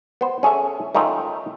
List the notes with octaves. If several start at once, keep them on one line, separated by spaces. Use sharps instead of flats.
B3 C5
C#4 G#4 A4 E5
D#3 A3 C#4 D#4 F4